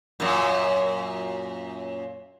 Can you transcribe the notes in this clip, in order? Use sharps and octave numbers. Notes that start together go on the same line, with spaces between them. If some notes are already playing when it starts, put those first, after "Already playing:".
F#2 A#2